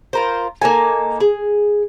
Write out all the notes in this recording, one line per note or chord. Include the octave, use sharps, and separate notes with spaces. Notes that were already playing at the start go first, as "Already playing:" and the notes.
F4 A#4 C5
A#3 D#4 A4 G#5
G#4